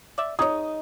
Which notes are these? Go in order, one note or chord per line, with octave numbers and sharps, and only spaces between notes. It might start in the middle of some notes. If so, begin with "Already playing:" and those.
D5 E5
D#4 G#4 C#5 D#5 D#6